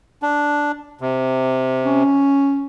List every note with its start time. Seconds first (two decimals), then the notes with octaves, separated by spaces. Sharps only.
0.23 D4
1.01 C3
1.85 C#4